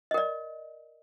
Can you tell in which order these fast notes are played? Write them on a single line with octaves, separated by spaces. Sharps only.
D#5 A#4 D5